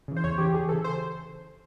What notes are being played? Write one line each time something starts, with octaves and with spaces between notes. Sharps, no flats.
C#3 E3
C5
E2 C#5
C#3 E3 G4
E2 G#4
C#3 E3 A4
C5